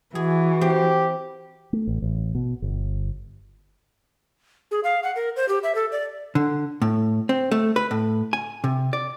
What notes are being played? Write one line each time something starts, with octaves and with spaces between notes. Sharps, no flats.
E3 F#4 G#4
C4 G4
A3
A1
A1
B2
G1
G#4
F5
F#5
A#4
C5
G4
E5
A4
D5
D3
A2
C4
A3
B4
A2
G#5
C3
D5